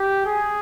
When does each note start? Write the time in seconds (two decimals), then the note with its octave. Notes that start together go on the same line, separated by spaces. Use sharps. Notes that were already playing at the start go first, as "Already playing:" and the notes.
Already playing: G4
0.26 G#4